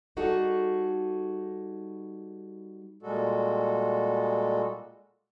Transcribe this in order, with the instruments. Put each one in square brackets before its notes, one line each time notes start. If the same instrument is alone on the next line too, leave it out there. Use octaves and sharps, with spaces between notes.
[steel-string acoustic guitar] G3 D#4 F#4 G#4 A4
[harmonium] A#2 G3 G#3 F#4 A4